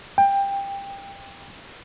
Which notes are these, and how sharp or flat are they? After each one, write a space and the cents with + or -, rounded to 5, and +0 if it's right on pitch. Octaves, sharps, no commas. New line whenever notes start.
G5 +20